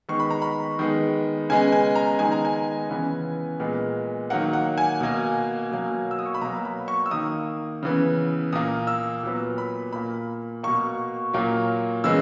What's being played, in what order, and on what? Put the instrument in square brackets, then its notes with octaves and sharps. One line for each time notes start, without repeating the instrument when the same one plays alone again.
[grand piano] D#3 G#3 B3 C#6
B5
A#5
B5
D#3 G#3 B3
C#3 G#3 B3 G#5
G#5
A#5
D#3 G#3 B3 G#5
A#5
G#5
C#3 E3 B3
A#2 G#3 B3
D#3 F#3 A#3 F#5
F#5
G#5
B2 A#3
B2 F#3 A#3
E6
D#6
C#6
B5
B2 F#3 A#3 A#5
B5
C#6
E6
D#3 A#3 D#6
C#3 E3 B3
A#2 A#3 D#6
E6
A#2 F#3 B3
B5
A#2 A#3 B5
B2 A#3 C#6
A#2 F#3 A#3
C#3 E3 G#3 B3 E6